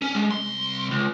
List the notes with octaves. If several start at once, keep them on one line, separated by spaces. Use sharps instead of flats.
C#4
G#3
C2 C6
C#2